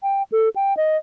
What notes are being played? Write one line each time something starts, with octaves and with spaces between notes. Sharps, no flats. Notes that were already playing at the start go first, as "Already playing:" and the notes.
G5
A4
G5
D#5